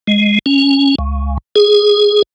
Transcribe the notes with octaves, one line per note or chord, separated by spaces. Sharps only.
G#3
C#4
C#2
G#4